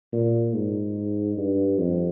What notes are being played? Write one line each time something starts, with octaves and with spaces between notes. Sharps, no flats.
A#2
G#2
G2
F2